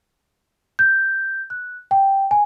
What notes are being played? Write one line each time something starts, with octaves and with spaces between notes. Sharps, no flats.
G6
F#6
G5
G#5